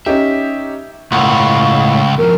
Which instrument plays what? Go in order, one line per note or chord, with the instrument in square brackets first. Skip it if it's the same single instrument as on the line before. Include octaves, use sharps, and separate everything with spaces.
[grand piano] C#4 D#4 G4 [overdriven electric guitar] E5
[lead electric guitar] C#2 [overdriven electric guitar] A2 A#3 [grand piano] F#5 [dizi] C#6
[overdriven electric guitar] D#2 F3 [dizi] A#4